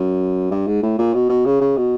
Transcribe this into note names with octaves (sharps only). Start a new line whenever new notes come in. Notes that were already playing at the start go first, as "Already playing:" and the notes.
Already playing: F#2
G2
G#2
A2
A#2
B2
B2
C#3
C#3
B2